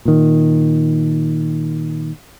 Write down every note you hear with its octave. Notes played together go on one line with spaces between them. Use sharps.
A#2 D#3